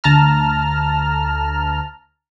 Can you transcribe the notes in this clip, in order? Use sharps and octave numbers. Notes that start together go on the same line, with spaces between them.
D2 A5 A#5 F6